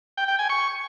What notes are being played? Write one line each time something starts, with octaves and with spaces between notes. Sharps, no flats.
G5
G5
G#5
C#6